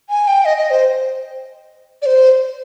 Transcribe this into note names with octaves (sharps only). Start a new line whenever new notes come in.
G#5
G5
D#5
D#5
C5
D5
C5